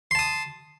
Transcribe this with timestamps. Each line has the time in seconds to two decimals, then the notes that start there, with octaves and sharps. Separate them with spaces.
0.11 C6
0.15 A5
0.19 D#6